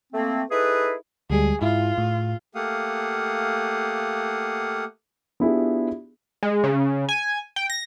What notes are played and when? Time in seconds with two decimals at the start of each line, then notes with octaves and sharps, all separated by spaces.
0.13 A3 A#3 C4
0.50 D#4 E4 G#4 A4 B4
1.30 D2 G3 G#3 G#4
1.62 G#2 E4 F4
1.98 A2
2.55 A3 A#3 G4 F5 F#5 D#6
5.40 B3 D4 E4 F4 G4 G#4
6.43 G#3
6.64 C#3
7.09 G#5
7.56 G5
7.70 A#6